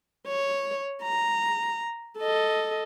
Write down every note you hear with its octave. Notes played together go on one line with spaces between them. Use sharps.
C#5
A#5
A4 D#5